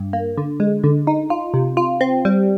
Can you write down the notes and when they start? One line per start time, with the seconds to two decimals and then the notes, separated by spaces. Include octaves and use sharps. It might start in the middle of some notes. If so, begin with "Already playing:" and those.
Already playing: G2
0.13 A#3
0.37 D3
0.60 G#3
0.84 D3
1.07 D#4
1.30 F4
1.54 C3
1.77 F4
2.01 C4
2.25 G3